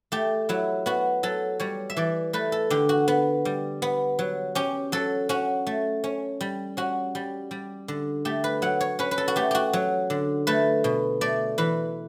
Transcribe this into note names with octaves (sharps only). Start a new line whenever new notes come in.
A3 G4
F#3 E4
B3 F#4
F#3 A4
G3 C#5
E5
E3 D5
A3 B4
A4
D3 G4
F#4
B3
G3
B3
F#3
C#4 G4
F#3 A4
C#4 F#4
A3
C#4
G3
C#4 F#4
G3
G3
D3
A3 G4
B4
F#3 F#5
C#5
C#4 B4
B4
A4
F#4
A3 G4
F#4 G4
F#3
D3
A3 B4
B2
A3 D5
E3 B4